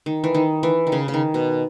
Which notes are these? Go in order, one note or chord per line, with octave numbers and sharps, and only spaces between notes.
D#3
E3
D#3
E3
D#3
C#3
C#3
D#3
B2